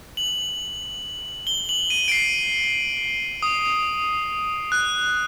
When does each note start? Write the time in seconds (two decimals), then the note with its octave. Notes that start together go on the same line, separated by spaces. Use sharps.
0.17 F#7
1.47 G7
1.69 F#7
1.90 D#7
2.08 D7
2.12 C7
3.42 D#6
4.72 F#6